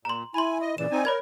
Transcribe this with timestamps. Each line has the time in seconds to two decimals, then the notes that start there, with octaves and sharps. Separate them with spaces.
0.05 A#2 A#5 C6
0.34 E4 G#5 B5 C6
0.61 D#5
0.78 A#2 C#3 E3 D5 E7
0.91 C4 D#4 G#5
1.05 A#4 C#5 B5 G#6